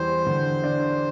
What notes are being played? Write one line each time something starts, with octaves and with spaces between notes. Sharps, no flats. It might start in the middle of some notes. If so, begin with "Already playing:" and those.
Already playing: E2 G3 C5
D3
D4